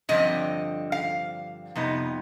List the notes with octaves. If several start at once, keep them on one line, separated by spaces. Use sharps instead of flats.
G2 D3 F3 C4 D#5
F5
F2 C3 G3 B3 D#4